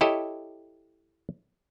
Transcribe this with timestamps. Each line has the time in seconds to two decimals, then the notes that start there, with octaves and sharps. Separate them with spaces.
0.01 E4 G4 A4 C#5 D#5